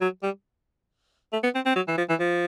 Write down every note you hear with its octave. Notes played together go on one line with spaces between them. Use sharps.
F#3
G3
A3
B3
C4
C4
F#3
E3
F3
E3
F3